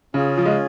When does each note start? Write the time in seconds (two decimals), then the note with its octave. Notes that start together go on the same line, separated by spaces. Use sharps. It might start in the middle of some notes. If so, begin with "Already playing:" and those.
0.14 C#3 C#4 F4 G#4
0.38 F3
0.45 G#3